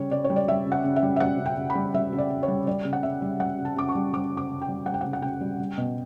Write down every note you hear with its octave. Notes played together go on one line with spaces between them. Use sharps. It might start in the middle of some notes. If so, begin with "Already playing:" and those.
Already playing: C#3 G3 C#5
C#3 D5
C#5
G3
D5
G3 E5
C#3
F#5
C#3
E5
G3
E5
G3 F#5
C#3
G5
C#3
B5
G3
G3 E5
C#3
D5
C#3
C#5
G3
G3 D5
C#3
F#5
C#3 E5
G3
G3 F#5
C#3
A5
C#3 D6
C#6
G3
G3 D6
C#3
D6
C#3
G5
G3
G3 F#5
G5
F#5
C#3
F#5
C#3 G5
G3
G3
B2